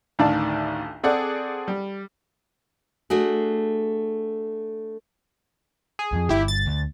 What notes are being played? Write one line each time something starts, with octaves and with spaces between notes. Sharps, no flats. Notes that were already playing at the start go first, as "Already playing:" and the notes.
A1 D2 D#3 D5 F5 A5
C4 G#4 A4 D5 F#5
G3
A3 D4 F#4 G#4
G#4
F2 F3
G1 E4 G4
A6
D2